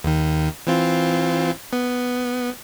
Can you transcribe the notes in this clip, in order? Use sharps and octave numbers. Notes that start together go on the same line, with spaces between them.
D#2 D#3
E3 C4 F4
B3